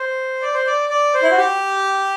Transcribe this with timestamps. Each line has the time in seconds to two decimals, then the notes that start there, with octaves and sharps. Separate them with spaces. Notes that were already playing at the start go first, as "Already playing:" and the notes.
Already playing: C5
0.42 D5
0.54 C5
0.67 D5
0.90 D5
1.14 C5
1.23 E4
1.31 F#4
1.38 G4